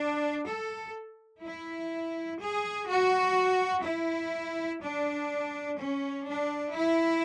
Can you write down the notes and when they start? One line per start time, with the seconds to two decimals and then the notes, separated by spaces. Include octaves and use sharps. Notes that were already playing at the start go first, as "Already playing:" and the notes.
Already playing: D4
0.46 A4
1.42 E4
2.39 G#4
2.88 F#4
3.84 E4
4.81 D4
5.78 C#4
6.26 D4
6.74 E4